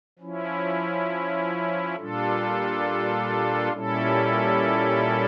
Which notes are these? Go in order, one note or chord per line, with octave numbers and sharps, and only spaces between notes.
F3 C#4 E4
A#2 G3 D4 F4 A4
A#2 G3 C#4 E4 A4